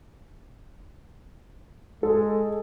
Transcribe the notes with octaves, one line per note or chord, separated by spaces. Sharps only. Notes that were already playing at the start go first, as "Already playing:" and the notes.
G#3 A4